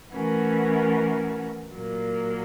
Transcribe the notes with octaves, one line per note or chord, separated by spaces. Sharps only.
E3 A3 C#4 F#4 A#4
A#2 F#3 A#3